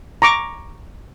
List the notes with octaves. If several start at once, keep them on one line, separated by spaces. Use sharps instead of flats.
A#5 C#6 D6